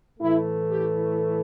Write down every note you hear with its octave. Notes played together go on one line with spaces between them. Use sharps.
A2 E3 A3 E4
G4